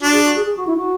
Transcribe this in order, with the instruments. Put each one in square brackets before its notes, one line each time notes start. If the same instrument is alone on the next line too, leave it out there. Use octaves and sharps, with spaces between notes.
[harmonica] D4 [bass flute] F#4
[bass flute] G#4
F#4
G#4
G#4
F#4
E4
F#4